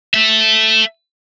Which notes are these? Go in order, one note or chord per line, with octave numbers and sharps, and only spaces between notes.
A4 E5